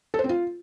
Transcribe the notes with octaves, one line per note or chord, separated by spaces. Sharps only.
A4
C5
C4
F4